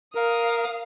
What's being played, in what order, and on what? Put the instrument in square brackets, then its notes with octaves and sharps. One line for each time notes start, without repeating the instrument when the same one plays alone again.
[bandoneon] A#4 [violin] F5 D#6